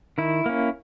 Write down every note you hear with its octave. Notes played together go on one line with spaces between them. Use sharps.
D#3 E4
A#3 C#4